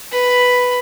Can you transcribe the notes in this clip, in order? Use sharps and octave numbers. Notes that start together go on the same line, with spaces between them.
B4 B5